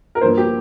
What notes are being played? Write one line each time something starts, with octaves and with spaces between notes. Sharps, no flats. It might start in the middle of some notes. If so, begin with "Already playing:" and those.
A#4
G2 F3 A#3 C5
G4